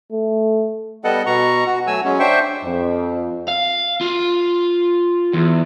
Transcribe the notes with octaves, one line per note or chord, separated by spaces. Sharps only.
A3
G3 B3 A4 D#5 F#5
B2 A#5 C#6
F#4
F#3 A3 G#5 E6
F#3 G#3 C#4
D4 C5 E5 G5 C#6
F2
F5
F4
E2